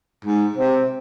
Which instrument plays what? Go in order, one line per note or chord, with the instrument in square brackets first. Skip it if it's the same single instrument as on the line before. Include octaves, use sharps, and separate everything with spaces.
[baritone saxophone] G#2 [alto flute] G#3
[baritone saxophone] C3 [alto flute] C5